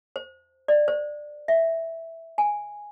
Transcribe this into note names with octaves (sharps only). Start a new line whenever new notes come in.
C5
D5
C5
E5
G#5